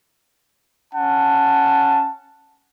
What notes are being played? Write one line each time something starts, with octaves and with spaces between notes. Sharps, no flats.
C#4 F#5 A5